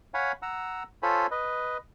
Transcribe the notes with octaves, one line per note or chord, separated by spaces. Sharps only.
C#5 F5 F#5 G#5 B5
F#5 A#5 E6
F4 A4 C5 C#5 G#5 B5
B4 D#5